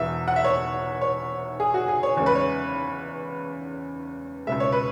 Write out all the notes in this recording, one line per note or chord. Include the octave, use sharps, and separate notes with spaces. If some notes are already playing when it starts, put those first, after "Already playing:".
Already playing: E1 E2 E3 E5
F#5
E5
C#5
C#5
G#4
F#4
G#4
C#5
E2 C#3 G#3 C#5
B4
C#5
C#2 B2 G#3 E5
C#5
B4